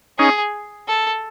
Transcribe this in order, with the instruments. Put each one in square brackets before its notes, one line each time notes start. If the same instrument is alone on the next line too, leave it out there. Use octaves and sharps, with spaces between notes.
[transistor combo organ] C#4 D#4 [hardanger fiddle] G#4
[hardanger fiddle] A4